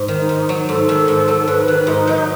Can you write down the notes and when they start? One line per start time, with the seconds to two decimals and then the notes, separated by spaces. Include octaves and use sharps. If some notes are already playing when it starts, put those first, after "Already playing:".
Already playing: G#2
0.08 D#3
0.15 D#4
0.29 G#2
0.49 F#3
0.68 G#2 A4
0.89 D#3
1.08 G#2
1.28 F#3
1.48 G#2 B4
1.68 D#3
1.87 G#2 D#4
2.07 F#3